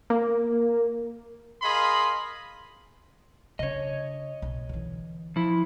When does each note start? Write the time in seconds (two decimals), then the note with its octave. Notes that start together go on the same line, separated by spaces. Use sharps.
0.10 A#3
1.62 G#4 A#4 D#5 F5 B5 C6
3.59 C#3 D4 C#5 D#5
4.42 B1
4.69 D3 E3
5.36 F3 E4